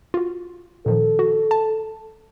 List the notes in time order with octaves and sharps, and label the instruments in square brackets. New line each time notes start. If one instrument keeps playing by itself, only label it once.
[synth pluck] F4 F#4
[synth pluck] A#2 D#3 F3 [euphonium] A4
[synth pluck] F#4
A5